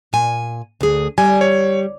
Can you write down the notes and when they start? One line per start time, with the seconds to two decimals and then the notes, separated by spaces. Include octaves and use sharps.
0.13 A#2 G#5
0.81 D2 G#4
1.18 G3 G#5
1.41 C#5